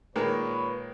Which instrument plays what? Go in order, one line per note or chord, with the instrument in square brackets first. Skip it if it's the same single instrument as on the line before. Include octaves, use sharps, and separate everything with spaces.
[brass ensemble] A#2 B4 C#5 [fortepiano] D#3 G#3 A#3